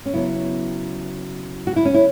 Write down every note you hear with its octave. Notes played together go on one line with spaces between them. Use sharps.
C#4
C#3 F#3 B3 E4
F#4
E4
C#4
E4